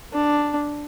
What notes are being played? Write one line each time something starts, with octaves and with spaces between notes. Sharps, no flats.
D4